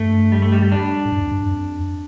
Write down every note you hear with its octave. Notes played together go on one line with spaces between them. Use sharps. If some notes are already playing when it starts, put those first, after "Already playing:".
Already playing: G2 A3
G3
A3
G3
G3
D4
A2
G2
F2
G2
G2
F2